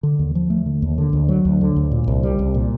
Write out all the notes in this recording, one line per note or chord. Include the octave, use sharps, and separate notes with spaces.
D3
D#2
F3
A3
D3
D#2
D3
D2
F#3
D2
D3
D2
A#2
C2
G3
C2
A#2